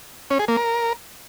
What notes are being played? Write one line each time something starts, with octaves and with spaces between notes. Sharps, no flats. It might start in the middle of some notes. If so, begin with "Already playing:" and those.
C#4
G#4
A#3
A#4